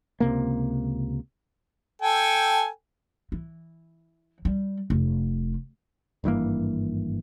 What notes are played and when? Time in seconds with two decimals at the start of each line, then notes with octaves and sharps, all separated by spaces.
0.20 C#2 C3 A#3
2.02 A4 G5 G#5
3.32 E3
4.45 G3
4.90 F1
6.24 G#1 G2 E3 A#3